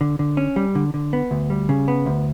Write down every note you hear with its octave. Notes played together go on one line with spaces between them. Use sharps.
D3
D3
C#4
G3
D3
D3
B3
D2
G3
C#3
B3
D2